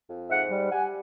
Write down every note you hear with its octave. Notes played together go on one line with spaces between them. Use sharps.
F2
G#2 E5 F#5
G3
G3 F#5 G#5